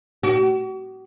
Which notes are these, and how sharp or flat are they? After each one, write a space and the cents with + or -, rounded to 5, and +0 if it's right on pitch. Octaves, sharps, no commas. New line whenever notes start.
F#4 +40